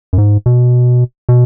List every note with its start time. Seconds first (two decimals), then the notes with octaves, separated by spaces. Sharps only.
0.13 F#2
0.18 G#2
0.46 B2
1.29 B2